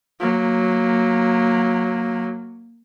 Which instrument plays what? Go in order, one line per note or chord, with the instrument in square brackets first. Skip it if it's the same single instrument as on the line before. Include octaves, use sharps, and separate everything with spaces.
[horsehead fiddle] F#3 A#3